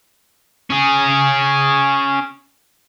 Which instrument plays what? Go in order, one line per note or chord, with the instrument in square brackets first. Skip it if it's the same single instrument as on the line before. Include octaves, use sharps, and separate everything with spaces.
[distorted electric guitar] C#4 G#4